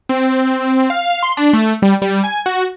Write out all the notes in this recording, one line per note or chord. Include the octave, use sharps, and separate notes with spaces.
C4
F5
C6
D4
A3
G3
G3
G#5
F#4